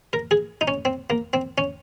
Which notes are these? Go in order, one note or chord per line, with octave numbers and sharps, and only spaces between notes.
A#4
G#4
D#4
C#4
C4
A#3
C4
C#4